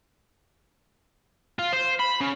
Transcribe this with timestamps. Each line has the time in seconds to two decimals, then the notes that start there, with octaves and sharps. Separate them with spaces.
1.59 F4
1.73 C5
1.99 B5
2.20 C#3